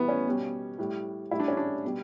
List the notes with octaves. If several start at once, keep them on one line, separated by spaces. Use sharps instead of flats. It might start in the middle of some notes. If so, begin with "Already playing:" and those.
Already playing: A2 E3 G3 B3
C#4
B2 G3
A2 G3
A2 G3 E4
D4
C#4
D4
B2 G3